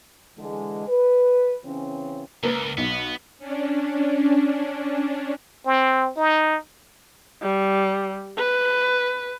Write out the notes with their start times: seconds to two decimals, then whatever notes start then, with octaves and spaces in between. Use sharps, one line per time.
0.38 D3 E3 G#3
0.87 B4
1.63 C#3 E3 C4 C#4
2.43 C#2 A#3 A#4 B4
2.78 B1 B3
3.39 C#4 D4
5.66 C4
6.17 D#4
7.42 G3
8.37 B4